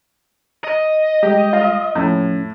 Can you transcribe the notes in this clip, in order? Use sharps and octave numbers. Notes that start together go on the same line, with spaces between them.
D#5
G3 G#3 G4
F4
E2 A2 F3 C#4